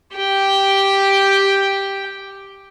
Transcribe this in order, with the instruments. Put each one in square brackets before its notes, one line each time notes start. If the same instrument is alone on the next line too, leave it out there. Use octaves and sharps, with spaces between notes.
[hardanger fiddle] G4 G5